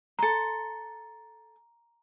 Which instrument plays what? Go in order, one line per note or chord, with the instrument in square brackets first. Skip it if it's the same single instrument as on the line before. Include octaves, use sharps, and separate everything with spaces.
[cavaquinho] A4 C6 [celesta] A#5 C#7